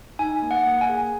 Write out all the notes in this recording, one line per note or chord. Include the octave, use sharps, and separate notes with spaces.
D#4 G#5
A#3
F#5
A#3
G#5
G#4